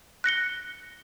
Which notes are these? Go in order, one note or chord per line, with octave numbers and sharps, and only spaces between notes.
F#6 A#6 C#7 G7